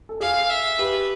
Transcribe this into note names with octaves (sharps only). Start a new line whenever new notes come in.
A4
G#4 F5
E5
G4 B4